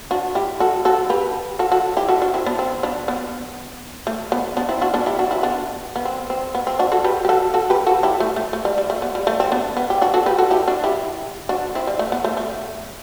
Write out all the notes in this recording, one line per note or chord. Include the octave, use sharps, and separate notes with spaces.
D4 F#4
E4 G4
F#4 A4
F#4 A4
G4 B4
F#4 A4
F#4 A4
E4 G4
F#4 A4
D4 F#4
C4 E4
B3 D4
C4
B3 D4
B3
A3
B3
B3 D4
C4 E4
D4 F#4
B3 D4
E4 G4
D4 F#4
C4 E4
B3 D4
B3
C4
C4
B3
C4
D4 F#4
F#4 A4
G4 B4
G4
F#4 A4
F#4 A4
G4 B4
F#4 A4
E4 G4
A3
A3
A3
G3
G3
A3
B3
G3
A3
C4
B3 D4
B3
G4
D4 F#4
F#4 A4
G4 B4
F#4 A4
E4 G4
D4 F#4
E4 G4
D4 F#4
C4 E4
G3
A3
B3
A3
A3